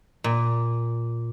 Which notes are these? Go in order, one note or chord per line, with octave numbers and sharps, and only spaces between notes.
A#2